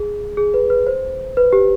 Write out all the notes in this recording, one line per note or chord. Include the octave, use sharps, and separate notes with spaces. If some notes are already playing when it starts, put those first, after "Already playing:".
Already playing: G#4
G#4
B4
B4
C5
B4
G4